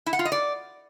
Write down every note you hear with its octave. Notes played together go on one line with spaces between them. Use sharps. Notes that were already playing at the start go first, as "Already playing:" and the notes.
E4
F#5
F4
D#5
D5